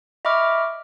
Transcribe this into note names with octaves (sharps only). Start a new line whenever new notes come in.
D#5 E5 B5 C#6 D6 F6